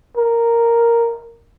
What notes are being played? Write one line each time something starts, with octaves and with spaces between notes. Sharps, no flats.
A#4